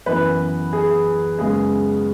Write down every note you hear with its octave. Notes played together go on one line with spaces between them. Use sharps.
F#2 E3 B3 B4
G#4
F#2 C#3 G#3 B3 G#4